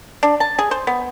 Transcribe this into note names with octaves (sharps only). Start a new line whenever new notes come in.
D4
A5
G#4
C5
B3